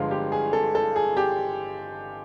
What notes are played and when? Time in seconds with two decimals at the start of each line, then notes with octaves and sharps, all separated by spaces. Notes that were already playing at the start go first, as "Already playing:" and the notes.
Already playing: G1 G2 D3 F3 G#3 F4
0.11 G4
0.32 G#4
0.53 A4
0.75 A4
0.96 G#4
1.17 G4